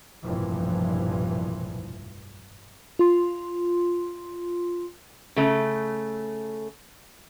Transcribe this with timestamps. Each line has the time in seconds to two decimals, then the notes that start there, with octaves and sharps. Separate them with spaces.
0.24 F1 B1 G2 A#2 E3 F3
2.99 F4 C6
5.36 C#3 A3